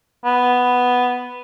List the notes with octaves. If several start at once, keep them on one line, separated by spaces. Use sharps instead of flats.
B3